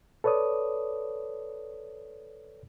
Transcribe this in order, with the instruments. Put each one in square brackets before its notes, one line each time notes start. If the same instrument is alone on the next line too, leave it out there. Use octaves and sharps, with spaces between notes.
[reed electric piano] A4 B4 C#5 D5 D#6